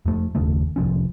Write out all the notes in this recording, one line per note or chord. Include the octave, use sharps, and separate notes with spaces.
F2 A3
F#1 D#2 C#3 A3
F1 C2 F3 C#4